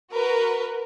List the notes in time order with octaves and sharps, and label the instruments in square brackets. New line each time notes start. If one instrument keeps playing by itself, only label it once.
[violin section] F#4 A#4 B4